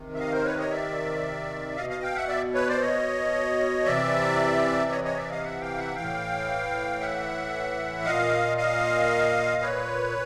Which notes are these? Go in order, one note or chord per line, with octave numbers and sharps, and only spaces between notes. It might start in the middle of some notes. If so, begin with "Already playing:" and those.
Already playing: C3 D#3
E5
D#5 F5
A#4 C5
B4 C#5
C#5 D#5
D5 E5
B2 D#5 F5
D#5 F5
F5 G5
E5 F#5
D5 E5
B4 C#5
C5 D5
C#5 D#5
C3 E3 D5 E5
C#5 D#5
C#5 D#5
D5 E5
D#5 F5
E5 F#5
F5 G5
E5 F#5
A2 E3 F5 G5
E5 F#5
A#2 D#5 F5
D#5 F5
B4 C#5